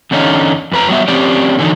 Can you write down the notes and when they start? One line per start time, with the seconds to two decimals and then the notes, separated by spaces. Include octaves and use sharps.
0.11 E2 D3 C#4 D#4 D5 F5
0.72 F2 B4 A#5
0.89 F#3 G3 B3 E5
1.08 F3 C4 C#4 G4 D5
1.59 D3 E3 F#3 C#4 D#4